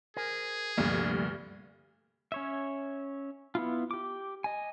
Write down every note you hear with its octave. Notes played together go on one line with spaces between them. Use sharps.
G#4 A#4 C5 G#5
D2 G2 C3 F3 A#3
C#4 C#5 E5
B3 E4 F4
G4 D6
D#5 G#5